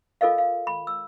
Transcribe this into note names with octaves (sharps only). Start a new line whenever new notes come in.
F4 A4 A#4 D#5 F5
F5
B5
E6